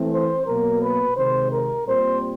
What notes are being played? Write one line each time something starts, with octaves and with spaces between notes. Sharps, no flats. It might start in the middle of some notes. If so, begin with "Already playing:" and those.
Already playing: E3 A3 C4
C5
B2 F#3 A#3 A#4
B4
C3 D#3 G#3 C5
A#4
A#2 G3 C4 C5